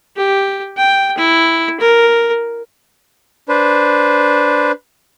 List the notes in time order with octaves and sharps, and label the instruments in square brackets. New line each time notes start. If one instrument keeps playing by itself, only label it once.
[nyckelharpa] G4
G5
E4
A#4
[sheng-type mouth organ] D4 B4 C5